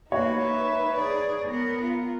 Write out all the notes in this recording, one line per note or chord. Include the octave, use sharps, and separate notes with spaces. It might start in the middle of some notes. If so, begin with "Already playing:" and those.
A#3 D#4 F#4 B4 C#5
E5
G#4 D5
B3 A#4
F4 A#4